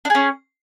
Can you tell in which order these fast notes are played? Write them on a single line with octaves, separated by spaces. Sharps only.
D4 G#4 C#4